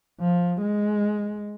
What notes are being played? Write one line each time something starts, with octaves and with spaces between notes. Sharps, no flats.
F3
G#3